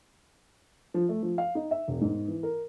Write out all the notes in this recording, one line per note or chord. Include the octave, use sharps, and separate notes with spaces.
F3
A3
F3
F5
D#4
E5
E1
G#2
E3
A#4